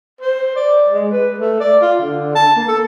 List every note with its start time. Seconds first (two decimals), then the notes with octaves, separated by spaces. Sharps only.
0.21 C5
0.56 D5
0.89 G#3
1.11 B4
1.38 A3
1.60 D5
1.82 F4
2.01 D3
2.35 A5
2.56 A#3
2.68 A4